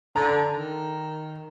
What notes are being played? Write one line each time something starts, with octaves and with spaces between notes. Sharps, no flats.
D3 A#5
D#3